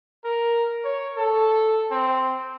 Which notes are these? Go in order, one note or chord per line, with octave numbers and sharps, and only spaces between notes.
A#4
C#5
A4
C4